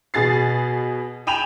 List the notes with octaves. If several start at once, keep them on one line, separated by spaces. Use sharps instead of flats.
B2 G#4 A6 C7
G5 G#5 B5 E7 F7